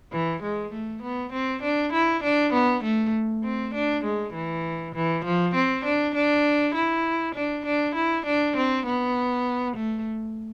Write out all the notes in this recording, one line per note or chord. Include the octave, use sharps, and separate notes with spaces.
E3
G#3
A3
B3
C4
D4
E4
D4
B3
A3
C4
D4
G#3
E3
E3
F3
C4
D4
D4
E4
D4
D4
E4
D4
C4
B3
A3